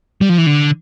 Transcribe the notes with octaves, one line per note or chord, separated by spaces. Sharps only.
G3
F3
E3
D3